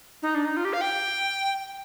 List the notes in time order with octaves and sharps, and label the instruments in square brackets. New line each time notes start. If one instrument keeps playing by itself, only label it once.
[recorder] D#4
D4
D#4
F4
G4
F5
G5